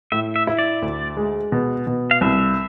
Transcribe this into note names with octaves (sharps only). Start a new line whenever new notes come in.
A2 E5
E5
E4
D5
D2
G#3
B2
B2
F5
C2 E5